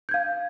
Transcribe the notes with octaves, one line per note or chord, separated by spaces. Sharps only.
F5 G6 G#6